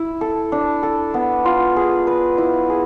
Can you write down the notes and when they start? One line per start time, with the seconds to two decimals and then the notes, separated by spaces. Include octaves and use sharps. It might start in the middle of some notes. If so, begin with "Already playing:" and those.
Already playing: E4
0.21 A4
0.52 D4
0.83 A4
1.14 B3
1.45 F4
1.76 G#4
2.07 B4
2.38 E4
2.70 G#4